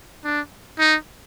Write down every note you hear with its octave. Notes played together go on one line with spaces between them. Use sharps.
D4
D#4